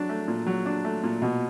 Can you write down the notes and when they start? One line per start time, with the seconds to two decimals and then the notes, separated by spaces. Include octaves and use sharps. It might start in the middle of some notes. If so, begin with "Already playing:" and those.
Already playing: F#3 D4
0.09 A3
0.28 A#2
0.46 F#3
0.66 D4
0.85 A3
1.03 A#2
1.22 B2